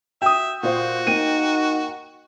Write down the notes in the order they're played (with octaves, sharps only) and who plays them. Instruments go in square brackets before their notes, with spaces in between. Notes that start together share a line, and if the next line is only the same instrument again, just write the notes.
[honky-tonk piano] F#4 [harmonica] E5 [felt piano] G5 D#6
[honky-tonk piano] A#2 C5 F5 [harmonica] F#4
[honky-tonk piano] A#3 G5 [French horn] D#4 [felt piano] D#7